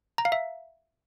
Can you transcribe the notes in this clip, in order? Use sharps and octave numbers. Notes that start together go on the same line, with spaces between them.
A#5
F5
E5